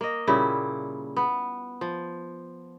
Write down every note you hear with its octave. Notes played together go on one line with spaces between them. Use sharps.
A#3 D#5
A#2 C#3 G3 E4
B3
F3